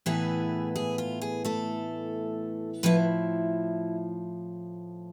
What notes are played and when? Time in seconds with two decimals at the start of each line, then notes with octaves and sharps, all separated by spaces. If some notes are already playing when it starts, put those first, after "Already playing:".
0.06 A2 E3 B3 E4 G#4
0.76 G#4
0.98 F4
1.21 G#4
1.45 A3 A4
2.83 A2 F3 B3 E4 B4